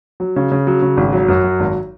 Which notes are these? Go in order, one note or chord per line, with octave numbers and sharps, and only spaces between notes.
F#3
C#3
C#3
F#3
C#3
G#1
F#3
F#2
F#3
G#1